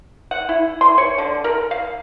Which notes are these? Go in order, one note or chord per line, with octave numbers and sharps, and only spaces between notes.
F#5
E4
C6
C#5
D3
A#4
F5